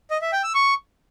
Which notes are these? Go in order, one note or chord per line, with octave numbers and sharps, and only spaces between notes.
D#5
E5
G5
E6
C#6